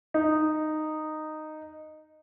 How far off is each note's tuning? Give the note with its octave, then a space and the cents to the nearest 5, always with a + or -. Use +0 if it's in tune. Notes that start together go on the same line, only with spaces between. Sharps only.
D#4 -10